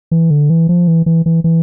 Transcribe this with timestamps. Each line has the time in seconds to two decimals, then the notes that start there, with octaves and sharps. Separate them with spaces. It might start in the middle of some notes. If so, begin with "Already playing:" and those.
0.11 E3
0.31 D3
0.50 E3
0.69 F3
0.88 E3
1.06 E3
1.26 E3
1.44 E3